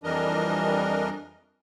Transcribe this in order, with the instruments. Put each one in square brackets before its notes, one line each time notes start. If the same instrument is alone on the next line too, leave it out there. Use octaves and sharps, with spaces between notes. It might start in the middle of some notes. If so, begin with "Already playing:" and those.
[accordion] F2 E3 G3 D4 A#4 D#5